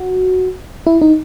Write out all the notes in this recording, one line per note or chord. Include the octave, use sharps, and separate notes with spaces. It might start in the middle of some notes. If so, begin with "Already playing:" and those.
Already playing: F#4
E4
D#4